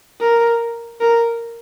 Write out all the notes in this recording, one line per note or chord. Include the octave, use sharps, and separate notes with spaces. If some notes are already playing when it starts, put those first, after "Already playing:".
A#4
A#4